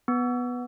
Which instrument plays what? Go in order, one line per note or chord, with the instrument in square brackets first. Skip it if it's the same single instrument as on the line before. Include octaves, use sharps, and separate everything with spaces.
[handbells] B3